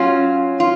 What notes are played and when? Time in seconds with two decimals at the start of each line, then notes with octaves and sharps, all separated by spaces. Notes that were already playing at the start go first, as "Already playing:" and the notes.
Already playing: F#3 C#4 F4
0.60 F4